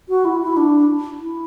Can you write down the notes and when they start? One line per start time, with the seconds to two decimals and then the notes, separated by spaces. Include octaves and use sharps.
0.09 F#4
0.25 E4
0.41 E4
0.57 D4
1.20 E4